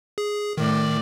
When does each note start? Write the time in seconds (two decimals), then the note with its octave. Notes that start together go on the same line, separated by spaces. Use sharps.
0.18 G#4
0.57 A2 D#3 D5